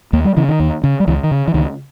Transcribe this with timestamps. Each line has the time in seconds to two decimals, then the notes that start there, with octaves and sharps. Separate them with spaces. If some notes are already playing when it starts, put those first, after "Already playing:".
0.13 D#2 A#3
0.25 G3
0.37 C#3 E3
0.49 D#3
0.60 D#2
0.84 C#3
1.00 G3
1.07 C#2 E3
1.23 D#3
1.31 C#3
1.48 E3
1.54 C#2 D#3